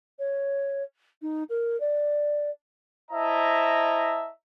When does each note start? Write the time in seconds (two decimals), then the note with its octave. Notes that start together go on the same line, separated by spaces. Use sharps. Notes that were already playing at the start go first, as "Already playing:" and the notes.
0.19 C#5
1.21 D#4
1.49 A#4
1.80 D5
3.11 E4 C5 D#5 E5 A5 A#5